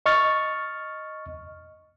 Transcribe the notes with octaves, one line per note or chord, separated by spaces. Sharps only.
D#5 C#6 F6 A6